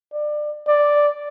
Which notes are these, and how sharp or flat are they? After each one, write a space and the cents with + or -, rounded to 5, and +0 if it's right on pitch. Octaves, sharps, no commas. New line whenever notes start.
D5 +25
D5 +0